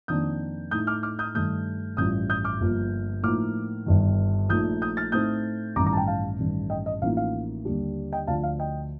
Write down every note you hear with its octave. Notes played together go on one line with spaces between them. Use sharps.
F2 D#3 A#3 D4 D#6 G6
A2 A3 D#4 D#6 G6
D6 F6
D6 F6
D#6 G6
G2 D#3 A3 D#6 G6
A1 G2 F3 D#6 G6
D#6 G6
D6 F6
G1 G2 F3 A#3
A2 F3 A#3 D#4 D6 F6
G1 G2 D#3
A#1 A#2 A3 D#4 D#6 G6
D#6 G6
F6 A6
A2 A3 C4 D#4 D#6 G6
A1 G2 D#3 A#5 D6
A#5 D6
A5
G5 A#5
F5 A5
A1 G2 D#3
D#5 G5
D#5
A1 A2 F3 A#3 D#4 F5
F5
D#2 D3 G3 D4
D#5 G5
D2 D3 F3 F5 A5
F5
D#5 G5